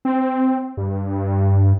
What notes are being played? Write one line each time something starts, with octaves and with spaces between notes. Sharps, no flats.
C4
G2